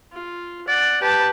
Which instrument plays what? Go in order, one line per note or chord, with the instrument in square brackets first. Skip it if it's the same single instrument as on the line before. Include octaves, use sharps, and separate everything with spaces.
[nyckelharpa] F4
[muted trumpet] D5 [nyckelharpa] F#5
[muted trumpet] G4 [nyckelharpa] B4 A5